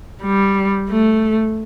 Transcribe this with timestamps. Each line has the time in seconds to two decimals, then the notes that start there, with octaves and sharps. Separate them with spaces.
0.23 G3
0.89 A3